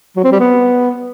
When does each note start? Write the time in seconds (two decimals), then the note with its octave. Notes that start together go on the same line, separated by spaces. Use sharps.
0.16 F#3
0.24 C4
0.32 G3
0.40 B3